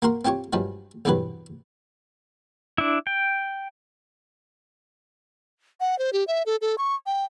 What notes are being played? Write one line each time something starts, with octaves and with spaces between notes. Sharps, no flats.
A#3 F#4 A#4 C6
C4 F4 G4 C#5 C#6
G2 F3 F#3 G#3
B1 E2 G2 C3 F#3 B4
D4 E4
G5
F#5
C5
G4
E5
A4
A4
C#6
G5